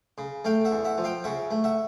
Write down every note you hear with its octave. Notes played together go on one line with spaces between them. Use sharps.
C#3
A3 F5 G5
E5 F#5
E2
E5 F#5
F3
F5 G5
C#3 E5 F#5
A3
E5 F#5